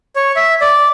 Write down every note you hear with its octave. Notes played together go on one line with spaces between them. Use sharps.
C#5
E5
D5